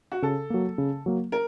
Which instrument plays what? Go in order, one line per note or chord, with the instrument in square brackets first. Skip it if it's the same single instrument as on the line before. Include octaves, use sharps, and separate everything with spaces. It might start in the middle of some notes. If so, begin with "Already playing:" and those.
[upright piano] F#4
[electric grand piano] C#3 [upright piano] A4
[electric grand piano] F#3 A#3
C#3
F#3 A#3
[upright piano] A#4